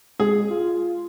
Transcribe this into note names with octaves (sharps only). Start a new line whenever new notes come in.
G#3 G#4
F4